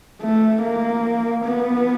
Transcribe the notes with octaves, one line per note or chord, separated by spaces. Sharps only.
A3
A#3
B3